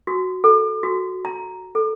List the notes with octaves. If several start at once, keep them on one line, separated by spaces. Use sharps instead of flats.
F#4
A4
F#4
A#5
A4